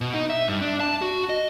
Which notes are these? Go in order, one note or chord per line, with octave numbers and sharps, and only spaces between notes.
B2
D#4
E5
G2
D4
A5
F#4
D#5